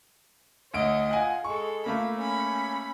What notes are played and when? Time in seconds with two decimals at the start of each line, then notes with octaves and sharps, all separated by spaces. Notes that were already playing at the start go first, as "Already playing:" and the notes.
0.74 D2 C#5 D#5 D7
1.11 F4 F#5 G#5
1.44 G#3 A4 C#6
1.86 A3 A#3 F4 B5
2.16 C#4 B5